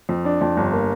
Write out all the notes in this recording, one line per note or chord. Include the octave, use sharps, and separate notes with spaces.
F2
D4
F2
G1
A#3